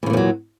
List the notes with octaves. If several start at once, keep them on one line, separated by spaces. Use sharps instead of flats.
E2 A#2 C#3 F3 F#3